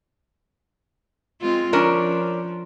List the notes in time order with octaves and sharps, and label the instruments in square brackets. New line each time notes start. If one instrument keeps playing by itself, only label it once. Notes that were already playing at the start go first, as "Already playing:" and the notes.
[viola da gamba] G#3 C4 F4
[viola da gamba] F3 [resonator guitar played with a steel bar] C#4 D4 A#4